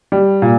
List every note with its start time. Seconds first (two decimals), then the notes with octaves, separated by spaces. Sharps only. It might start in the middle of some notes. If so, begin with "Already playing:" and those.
0.12 G3
0.42 A#2